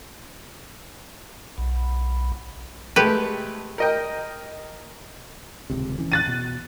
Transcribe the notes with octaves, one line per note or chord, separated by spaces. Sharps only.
B1
G#3 A3 G4 B4
A#4 D#5 G5
D#1 C#2 C3
E3 C#4
F#6 A6 D#7
B2